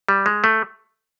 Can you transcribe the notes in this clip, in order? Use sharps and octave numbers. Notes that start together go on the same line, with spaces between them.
G3
G#3
A3